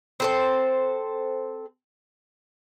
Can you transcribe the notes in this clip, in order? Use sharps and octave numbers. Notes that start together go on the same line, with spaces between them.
C4 A4 C5